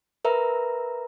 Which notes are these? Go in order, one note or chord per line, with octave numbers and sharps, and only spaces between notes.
A#4 B4 E5 A#5